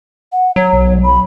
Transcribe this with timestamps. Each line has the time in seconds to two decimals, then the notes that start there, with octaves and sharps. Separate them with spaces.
0.32 F#5
0.56 F#3 C#5
0.73 B1
1.03 B5